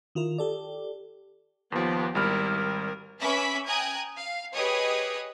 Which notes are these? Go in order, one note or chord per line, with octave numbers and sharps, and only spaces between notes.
D#3 E4 F4 A#4
G4 A4 D5
D#2 F3 B3 G4
G#1 G3 E4 A#4 F6
A#4
C#4 B4 E5 B5 D6 B6
G5 G#5 A#5 D#6 F#6 G#6
F5
G4 G#4 B4 C#5 D#5 D#6